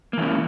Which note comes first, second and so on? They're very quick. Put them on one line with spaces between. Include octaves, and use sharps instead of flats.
A#3 E3 C#4